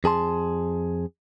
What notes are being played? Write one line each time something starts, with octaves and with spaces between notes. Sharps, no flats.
F2 G#4 A5 C6